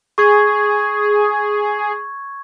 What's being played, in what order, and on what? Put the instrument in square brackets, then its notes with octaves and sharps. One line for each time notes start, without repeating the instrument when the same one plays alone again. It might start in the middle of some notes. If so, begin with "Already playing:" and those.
[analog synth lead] G#4 [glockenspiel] C#6 G#6